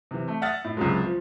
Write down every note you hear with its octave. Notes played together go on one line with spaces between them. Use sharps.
C3 E3
A3
E5 F#5 D#6 F6 A6
A2
C#2 C3 F#3 G#3
F3